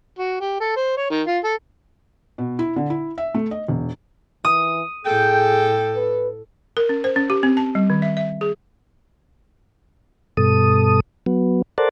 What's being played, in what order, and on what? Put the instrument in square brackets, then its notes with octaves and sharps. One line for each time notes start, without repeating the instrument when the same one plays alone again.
[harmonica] F#4
G4
A4
C5
C#5
D#3
F4
A4
[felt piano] B2
E4
D3
E4
E5
A3
D#5
E1
[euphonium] E3 [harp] D#6
[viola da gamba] A2 A4 [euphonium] G#4 [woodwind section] G5
[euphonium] B4
[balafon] A#4
C#4
C5
C#4
G4
C4
A5
G3
D#3
E5
E5
G#4
[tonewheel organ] G2 B2 A4 D#6
F#3 B3
A4 A#4 C5 D5 F#5 A5